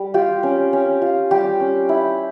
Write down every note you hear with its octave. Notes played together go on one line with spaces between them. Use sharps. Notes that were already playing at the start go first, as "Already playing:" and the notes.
Already playing: G3
F4 G4
C#4
C#4
F4
G3 G4
C#4
E4